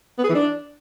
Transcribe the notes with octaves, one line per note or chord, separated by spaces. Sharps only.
B3
G#4
E3
D4